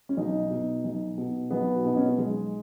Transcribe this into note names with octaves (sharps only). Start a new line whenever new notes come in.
C#4
B1 D#4
B2
B1
B2
B1 B3
F#4
B2 D#4
C#4
B3
B1 G#3